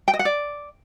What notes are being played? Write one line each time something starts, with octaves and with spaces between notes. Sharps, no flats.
G5
D#5
F#5
D5